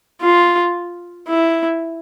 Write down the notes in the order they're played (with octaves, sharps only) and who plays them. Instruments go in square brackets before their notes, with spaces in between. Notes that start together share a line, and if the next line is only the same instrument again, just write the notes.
[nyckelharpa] F4
E4